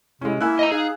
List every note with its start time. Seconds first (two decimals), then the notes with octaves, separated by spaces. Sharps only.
0.21 C3 G#3 C#4 E4
0.41 A#3 E4 G#5 E6 F#6
0.59 D#5 A#5
0.72 D#4 G#4 F5